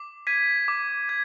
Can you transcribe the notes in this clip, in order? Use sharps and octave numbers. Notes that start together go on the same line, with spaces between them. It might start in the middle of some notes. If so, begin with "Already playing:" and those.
Already playing: D6
G#6 B6 D#7
D6
G#6